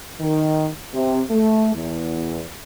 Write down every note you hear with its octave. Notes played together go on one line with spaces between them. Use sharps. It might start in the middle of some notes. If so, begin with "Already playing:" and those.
D#3
C3
A3
E2